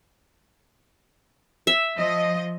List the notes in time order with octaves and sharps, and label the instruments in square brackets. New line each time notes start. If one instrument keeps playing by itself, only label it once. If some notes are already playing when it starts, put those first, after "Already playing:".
[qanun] E5
[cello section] F3 D#5